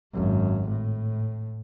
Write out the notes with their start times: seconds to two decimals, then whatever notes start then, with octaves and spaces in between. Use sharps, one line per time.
0.14 G#1 F#2
0.69 A2